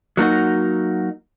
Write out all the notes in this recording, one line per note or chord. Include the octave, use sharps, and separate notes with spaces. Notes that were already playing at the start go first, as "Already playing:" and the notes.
F#3 A#3 D#4 F#4